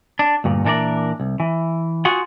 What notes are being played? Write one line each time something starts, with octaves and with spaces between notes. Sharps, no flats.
D4
D2 G2 A#2
A#2 E3 D4 A4 A#4 D5
C2
E3
F4 F#4 G#4 F#5